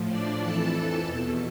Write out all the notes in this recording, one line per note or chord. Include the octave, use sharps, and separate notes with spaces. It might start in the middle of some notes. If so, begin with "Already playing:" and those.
Already playing: A2 F3
D4 D5
F2 E3 A4 A5
E2 B2